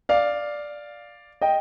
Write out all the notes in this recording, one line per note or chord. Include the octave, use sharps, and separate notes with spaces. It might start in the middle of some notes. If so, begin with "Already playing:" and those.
D5 F5
D#5 G5